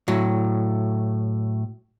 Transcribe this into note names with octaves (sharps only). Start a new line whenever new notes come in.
A2 F#3